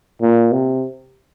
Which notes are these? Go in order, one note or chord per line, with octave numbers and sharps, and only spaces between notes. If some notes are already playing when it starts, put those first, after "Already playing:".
A#2
C3